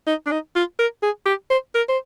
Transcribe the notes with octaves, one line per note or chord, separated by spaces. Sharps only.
D#4
D4
D#4
F4
A#4
G#4
G4
C5
A#4
C5